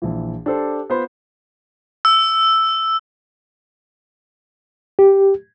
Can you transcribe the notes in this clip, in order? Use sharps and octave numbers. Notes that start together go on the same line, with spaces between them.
A#1 E3
D4 G4 A4 C5
B3 F4 C5 B5 C6
E6
G4